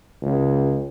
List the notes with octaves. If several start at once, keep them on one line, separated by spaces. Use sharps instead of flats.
C#2